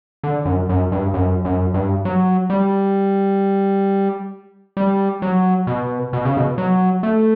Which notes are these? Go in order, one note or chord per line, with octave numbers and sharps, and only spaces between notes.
D3
F#2
F#2
G2
F#2
F#2
G2
F#3
G3
G3
F#3
B2
B2
C#3
B2
F#3
A3